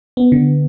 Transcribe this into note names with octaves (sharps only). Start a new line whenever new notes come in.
B3
D3